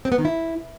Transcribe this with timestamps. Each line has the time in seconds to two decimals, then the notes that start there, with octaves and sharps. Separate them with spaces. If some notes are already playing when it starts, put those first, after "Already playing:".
0.05 C4
0.12 B3
0.18 D#3
0.25 E4